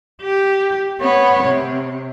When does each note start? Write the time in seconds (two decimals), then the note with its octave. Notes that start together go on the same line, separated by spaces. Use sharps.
0.22 G4
1.01 B3 C#5
1.43 C3